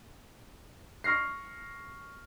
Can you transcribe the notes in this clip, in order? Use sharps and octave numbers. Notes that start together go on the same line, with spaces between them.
C#6 F6 A#6 C7